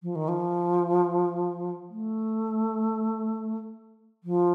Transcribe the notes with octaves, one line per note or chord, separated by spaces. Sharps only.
F3
D#3
F3
A3
F3